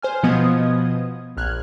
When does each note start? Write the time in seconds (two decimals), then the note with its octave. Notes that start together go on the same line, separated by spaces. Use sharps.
0.02 C5 G#5 F6
0.23 B2 F3 B3 D#5 D#6 G#6
1.37 A#1 F6 F#6 G#6